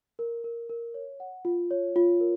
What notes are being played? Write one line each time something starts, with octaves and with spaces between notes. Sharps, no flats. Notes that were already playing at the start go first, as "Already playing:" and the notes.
A#4
A#4
A#4
C#5
F#5
F4
C#5
F4
A#4